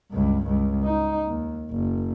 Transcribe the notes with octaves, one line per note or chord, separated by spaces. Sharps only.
C#2 G2
C#2
D#4
D#2
F#1